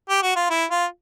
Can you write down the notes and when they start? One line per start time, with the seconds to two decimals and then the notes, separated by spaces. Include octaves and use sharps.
0.09 G4
0.23 F#4
0.36 F4
0.50 E4
0.71 F4